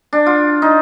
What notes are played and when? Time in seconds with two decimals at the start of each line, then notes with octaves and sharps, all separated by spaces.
0.13 D4
0.26 F4
0.62 D#4